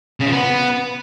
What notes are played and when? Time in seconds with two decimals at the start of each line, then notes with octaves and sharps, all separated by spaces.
0.20 C#3
0.26 F3
0.32 B3